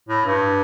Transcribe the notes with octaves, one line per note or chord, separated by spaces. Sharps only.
A2
G2